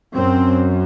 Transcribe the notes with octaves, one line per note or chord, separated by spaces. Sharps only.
F#2 C4